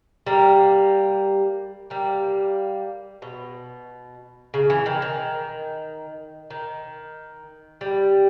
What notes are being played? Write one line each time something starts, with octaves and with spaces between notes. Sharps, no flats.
G3 A#3
G3 A#3
B2
C#3
E3
D#3
D#3
D#3
G3